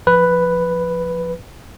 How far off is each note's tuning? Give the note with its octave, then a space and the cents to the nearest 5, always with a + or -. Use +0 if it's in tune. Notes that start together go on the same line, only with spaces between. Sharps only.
F3 +0 B4 +0